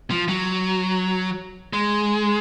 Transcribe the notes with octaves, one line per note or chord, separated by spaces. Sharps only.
F3
F#3
G#3